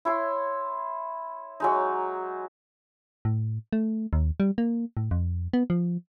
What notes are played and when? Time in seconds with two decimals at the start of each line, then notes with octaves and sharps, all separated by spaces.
0.05 E4 C#5 C6
1.60 F#3 G#3 D#4
3.25 A2
3.73 A3
4.13 D#2
4.40 G3
4.58 A#3
4.97 A2
5.11 F2
5.53 B3
5.70 F3